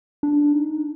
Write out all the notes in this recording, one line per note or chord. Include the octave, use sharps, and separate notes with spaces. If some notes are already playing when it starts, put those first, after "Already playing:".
D4
D#4